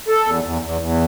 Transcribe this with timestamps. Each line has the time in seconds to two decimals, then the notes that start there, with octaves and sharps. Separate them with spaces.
0.08 A4
0.25 E2
0.44 E2
0.62 E2
0.81 E2